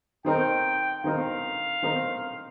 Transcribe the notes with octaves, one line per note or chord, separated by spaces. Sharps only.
D#3 C4 D#4 A#4 G5
D#3 C4 D#4 A#4 F5
D#3 C4 D#4 A#4